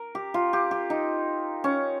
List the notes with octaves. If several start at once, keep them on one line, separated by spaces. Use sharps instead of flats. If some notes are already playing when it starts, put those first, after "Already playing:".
Already playing: A#4
G4
F4
G4
G4
D#4
C#4